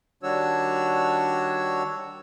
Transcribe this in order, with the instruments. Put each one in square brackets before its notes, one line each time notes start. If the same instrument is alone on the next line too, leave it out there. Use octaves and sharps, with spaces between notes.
[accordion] D#3 G3 D4 F#4 C#5 E6